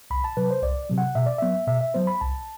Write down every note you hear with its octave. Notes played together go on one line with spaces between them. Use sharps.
C2 B5
A5
C3 F#3 B4
C5
C2 D5
C3 F#3
F#5
B2 E5
D5
F#3 B3 E5
B2 E5
E5
F#3 B3 C5
B5
C2 A5